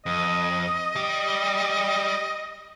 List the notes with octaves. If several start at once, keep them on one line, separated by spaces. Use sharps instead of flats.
F2 D#5
G3 G4